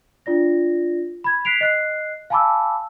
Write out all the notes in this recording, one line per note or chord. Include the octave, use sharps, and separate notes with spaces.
D4 F4 D5 A#6
B5 G#6
F#6 B6 C7 D7 F7
D#5 F#6 C7
F5 G#5 A5 B5 D6 E6